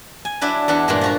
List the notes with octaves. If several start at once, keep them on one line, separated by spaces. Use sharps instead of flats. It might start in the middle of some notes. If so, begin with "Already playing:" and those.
G#5
F#3 D4 E4 B4
E2 E3 D4 F#5
G2 A#2 G#3
F3 F#4 A#5